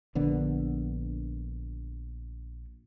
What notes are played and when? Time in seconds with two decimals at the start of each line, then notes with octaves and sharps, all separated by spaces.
0.15 A#1 D3 B3